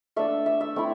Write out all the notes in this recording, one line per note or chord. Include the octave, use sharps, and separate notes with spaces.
A3 D4 E5
E5
E5
A3 C4 E4